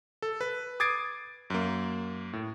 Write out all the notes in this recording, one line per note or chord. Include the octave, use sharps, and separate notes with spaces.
A4
B4
D6 D#6 G#6 A6 C7 D7
F#2 A#3
A2